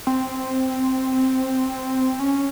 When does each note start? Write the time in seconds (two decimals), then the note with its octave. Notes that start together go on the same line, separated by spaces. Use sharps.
0.07 C4
2.19 C#4